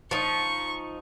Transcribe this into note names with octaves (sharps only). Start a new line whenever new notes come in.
F3 D#4 C#6